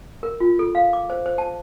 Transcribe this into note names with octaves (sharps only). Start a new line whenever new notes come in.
A#4
F4
A4
F5
D6
C5
C5
A5